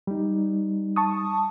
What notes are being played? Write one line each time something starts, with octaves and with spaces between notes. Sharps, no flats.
G3 D#4
A5 C#6 D#6